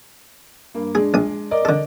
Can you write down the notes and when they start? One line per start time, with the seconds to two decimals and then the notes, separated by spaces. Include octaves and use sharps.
0.74 G2 A#3
0.95 G#3 D4 G#4
1.14 A#1 D#6
1.51 A#4 D5 D#5
1.65 D3 A4